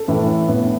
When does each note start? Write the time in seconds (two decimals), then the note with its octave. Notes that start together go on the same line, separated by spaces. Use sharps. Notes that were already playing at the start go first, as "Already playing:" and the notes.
Already playing: A4
0.08 A2 E3
0.48 A2 E3 B3